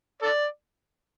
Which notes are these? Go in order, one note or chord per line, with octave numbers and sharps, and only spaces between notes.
A4 D5